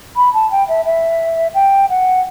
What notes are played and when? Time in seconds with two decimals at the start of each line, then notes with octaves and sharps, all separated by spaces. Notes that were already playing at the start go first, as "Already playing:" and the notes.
0.17 B5
0.34 A5
0.51 G5
0.68 E5
0.85 E5
1.55 G5
1.90 F#5